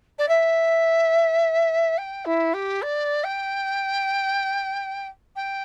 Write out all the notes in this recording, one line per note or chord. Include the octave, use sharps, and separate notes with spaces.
D5
E5
G5
E4
G4
D5
G5
G5